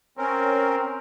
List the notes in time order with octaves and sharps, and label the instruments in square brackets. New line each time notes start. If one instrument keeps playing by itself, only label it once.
[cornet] C4 [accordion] C#4 A#4